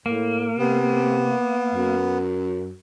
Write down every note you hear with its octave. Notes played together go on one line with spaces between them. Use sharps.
A2 A#3
C3 B3
F#2